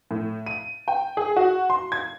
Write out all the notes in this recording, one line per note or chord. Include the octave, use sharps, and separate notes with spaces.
A2
D#7
G5
G#4
F#4
C6
G#6